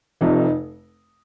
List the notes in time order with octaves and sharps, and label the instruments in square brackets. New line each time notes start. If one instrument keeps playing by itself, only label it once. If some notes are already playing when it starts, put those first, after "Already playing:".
[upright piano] F1 F2 C3 D#4